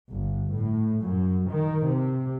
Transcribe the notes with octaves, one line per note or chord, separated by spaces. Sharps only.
G1
A2
F#2
D#3
C3